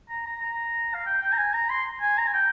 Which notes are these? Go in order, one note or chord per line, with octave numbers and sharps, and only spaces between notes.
A#5
A#5
A#5
F5
G5
G5
A#5
G#5
A#5
C6
G#5
A#5
G#5
G5